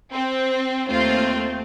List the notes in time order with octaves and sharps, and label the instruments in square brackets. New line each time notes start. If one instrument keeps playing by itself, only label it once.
[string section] C4
[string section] D#2 F4 [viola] A3 C4